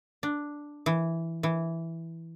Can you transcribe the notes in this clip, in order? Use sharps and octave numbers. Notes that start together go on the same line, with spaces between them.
D4
E3
E3